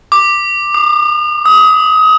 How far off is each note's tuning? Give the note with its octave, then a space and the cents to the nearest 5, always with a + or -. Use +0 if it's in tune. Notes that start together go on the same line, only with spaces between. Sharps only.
D6 +10
D#6 -45
D#6 +30